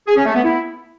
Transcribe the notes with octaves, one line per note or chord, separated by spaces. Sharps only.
G#4
C#4
A3
B3
E4